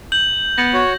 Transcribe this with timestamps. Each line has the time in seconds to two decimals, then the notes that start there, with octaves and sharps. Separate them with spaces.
0.12 G6 F#7
0.58 B3 A#6
0.73 F#4 C#5